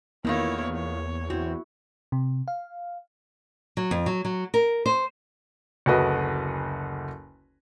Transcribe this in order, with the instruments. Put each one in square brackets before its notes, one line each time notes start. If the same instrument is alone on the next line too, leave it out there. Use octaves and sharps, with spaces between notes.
[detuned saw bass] E2 [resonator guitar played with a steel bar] A2 D#3 F4 [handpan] A#3 B3 [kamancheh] E4 C#5
[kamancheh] C#5
[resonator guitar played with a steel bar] C4 [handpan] E4 F#4
[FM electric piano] C3
F5
[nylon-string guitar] F#3
F2
F#3
F#3
A#4
C5
[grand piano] F#1 D2 F#4 A4 B4 D#5